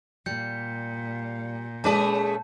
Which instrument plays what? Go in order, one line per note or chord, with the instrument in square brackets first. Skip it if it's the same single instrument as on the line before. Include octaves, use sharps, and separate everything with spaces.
[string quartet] A#2 [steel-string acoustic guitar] G3 [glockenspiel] G6 C#7
[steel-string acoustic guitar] G#3 G#4 [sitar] A3 C#4 B4 [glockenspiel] A5